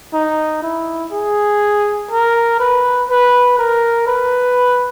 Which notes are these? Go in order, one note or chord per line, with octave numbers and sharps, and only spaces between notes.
D#4
E4
G#4
A#4
B4
B4
A#4
B4